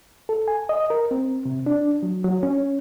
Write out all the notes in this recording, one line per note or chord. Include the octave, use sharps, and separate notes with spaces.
A4
G#5
D#5
A#4
C4
C3
D4
F#3
F#3
C#4